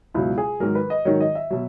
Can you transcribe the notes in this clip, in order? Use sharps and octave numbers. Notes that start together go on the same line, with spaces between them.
C#2 B2 F#3 E4
G#4
G#2 D#3 F#3 A#4
B4
D#5
G#2 D#3 F#3 C#5
D#5
E5
B2 F#3